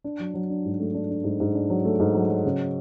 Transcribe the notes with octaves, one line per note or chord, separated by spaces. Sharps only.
D4
F#3
F#3
D4
G#2
A3
D4
D4
G#2
G#2
D4
F#3
A3
G#2
F#3
F#3
C#3